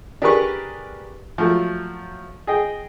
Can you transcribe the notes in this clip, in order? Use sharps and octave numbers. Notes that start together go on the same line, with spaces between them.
D4 G4 G#4 A#4 B4 C#6
F3 F#3 A3
G#4 D#5 G5